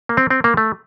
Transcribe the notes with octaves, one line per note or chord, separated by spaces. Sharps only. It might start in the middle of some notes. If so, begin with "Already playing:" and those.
A#3
C4
C4
A#3
A3